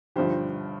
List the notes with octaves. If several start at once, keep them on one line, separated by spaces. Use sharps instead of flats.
G1 G2 F3 G4 C5